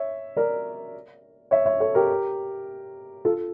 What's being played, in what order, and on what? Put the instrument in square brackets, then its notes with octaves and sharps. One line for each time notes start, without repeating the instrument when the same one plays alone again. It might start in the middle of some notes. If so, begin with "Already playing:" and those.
Already playing: [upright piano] C#5 E5
A#4 D5
C#5 E5
C#5 E5
A4 C#5
G4 A#4
F4 A4